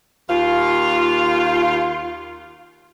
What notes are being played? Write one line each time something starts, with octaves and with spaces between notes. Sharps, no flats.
D#2 F4